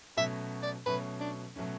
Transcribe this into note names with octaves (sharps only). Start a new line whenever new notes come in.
B2 F#3 A3 C#4 E5
D5
B2 F#3 A3 C#4 B4
D4
B2 F#3 A3 C#4